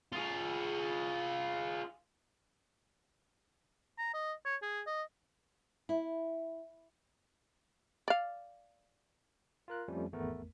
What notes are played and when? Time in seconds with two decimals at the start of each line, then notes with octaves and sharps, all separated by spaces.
0.13 F4 G#4
3.98 A#5
4.14 D#5
4.46 C#5
4.62 G#4
4.87 D#5
5.89 E4
8.08 D5 F5
9.68 F4 A#4 F#6
9.88 F2 F3 G3 A3 C#4
10.12 G#1 E2 A3 B3 A#4